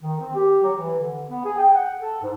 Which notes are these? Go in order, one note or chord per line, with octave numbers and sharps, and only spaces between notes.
D#3
C4
G4
F#3
E3
D3
B3
G#4
G5
F#5
A4
G#2